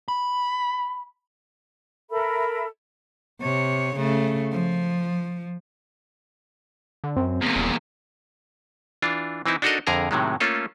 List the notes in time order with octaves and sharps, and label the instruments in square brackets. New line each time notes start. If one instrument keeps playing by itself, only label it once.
[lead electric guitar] B5
[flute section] A4 A#4 E5 B5
[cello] C3 C#5
C#3 A3
F3
[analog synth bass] D3
[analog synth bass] F#2 [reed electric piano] C4
[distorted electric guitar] E2 A#2
[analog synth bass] D#1
[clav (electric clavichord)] E3 D4 F4
E3 C4 D#4 E4
D4 D#4 F#4 A4 A#4 D#5
F2 D3 G#4 A#4 A#5
A2 C3 D#3 F#3 G#3
A3 A#3 C#4 F4 A4